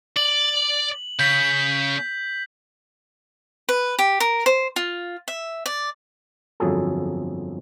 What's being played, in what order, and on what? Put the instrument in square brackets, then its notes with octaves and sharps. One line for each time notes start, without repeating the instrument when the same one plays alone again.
[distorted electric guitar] D5 [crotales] F#7
[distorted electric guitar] C#3 [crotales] G6 B6
[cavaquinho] B4
G4
A#4
C5
F4
E5
D5
[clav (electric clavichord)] G1 F2 F#3 G#4 A4